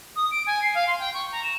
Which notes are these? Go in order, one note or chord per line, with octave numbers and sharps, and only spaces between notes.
D#6
D7
G#5
C7
F5
C6
G5
C#6
A#5
E7